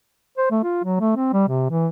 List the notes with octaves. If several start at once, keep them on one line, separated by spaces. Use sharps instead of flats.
C5
A3
F4
F#3
A3
C4
G3
C3
E3